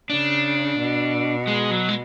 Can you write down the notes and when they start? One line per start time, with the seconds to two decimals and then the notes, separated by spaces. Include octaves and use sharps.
0.10 C#3 D4
0.78 B2
1.47 G#3
1.71 F#3
1.89 G#3